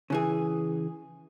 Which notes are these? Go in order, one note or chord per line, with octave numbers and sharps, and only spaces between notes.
C#3 E3 G#4